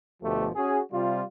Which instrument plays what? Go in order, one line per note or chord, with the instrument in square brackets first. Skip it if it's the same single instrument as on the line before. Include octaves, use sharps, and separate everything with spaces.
[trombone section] D2 B2 F3 A3 G4
C#4 F#4 G#4
C3 G3 F4